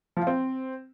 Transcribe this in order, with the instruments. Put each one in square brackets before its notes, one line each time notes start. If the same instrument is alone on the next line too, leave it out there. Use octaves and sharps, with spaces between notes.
[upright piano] F3
F4
C4